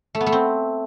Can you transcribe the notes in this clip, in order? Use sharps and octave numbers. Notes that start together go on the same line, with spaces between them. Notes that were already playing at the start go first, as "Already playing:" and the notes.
A3
B3
A3
C4